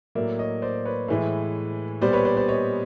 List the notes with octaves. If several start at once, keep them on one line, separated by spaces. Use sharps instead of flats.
A2 F#3 A#3 D5 E5
C#5 D#5
C5 D5
B4 C#5
A2 E3 G#3
A#2 G3 B3 C5 D5
B4 C#5
C5 D5
C5 D5
C#5 D#5